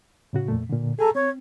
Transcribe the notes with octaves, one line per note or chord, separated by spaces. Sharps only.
A2 C#3 F#4
F2 A#2 A3
A#2 D3
G#4 A4 G#5 A#5
C4 C#5